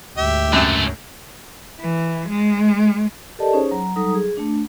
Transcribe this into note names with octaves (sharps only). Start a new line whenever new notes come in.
D2 G#2 G4 E5
C#2 F#2 A3
E3
G#3
G4 A4 A#4 D5 D#5 A5
C#4 D#4 G#4 C5 C#5
F#3 A#5
F#3 G3 D#4 A4 A#5 D#6
G#4
A3 D4